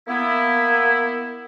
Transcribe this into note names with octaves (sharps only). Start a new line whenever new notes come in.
A#3 B3 E4